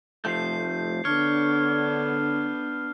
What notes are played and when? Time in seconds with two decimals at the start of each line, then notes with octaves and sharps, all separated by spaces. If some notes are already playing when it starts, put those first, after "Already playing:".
0.25 F1 F3 A3 G6 C7
1.05 D3 B3 D4 C#5 F6